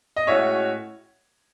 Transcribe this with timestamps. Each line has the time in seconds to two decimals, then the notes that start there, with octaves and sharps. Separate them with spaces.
0.16 D#5
0.27 A2 G#3 C#4 F#4 C#5 E5